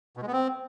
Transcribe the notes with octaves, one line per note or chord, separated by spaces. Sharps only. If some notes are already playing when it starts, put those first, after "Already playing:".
B2
G#3
B3
C4